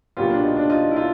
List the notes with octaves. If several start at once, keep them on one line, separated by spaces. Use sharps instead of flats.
B1 A#2 F#3 B3 F4 G4
D4
D#4
D4
D#4 F4
E4
D#4 F4